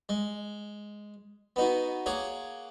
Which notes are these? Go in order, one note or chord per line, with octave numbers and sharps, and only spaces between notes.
G#3
B3 D#4 F#4
A#3 G#4 C#5 F#5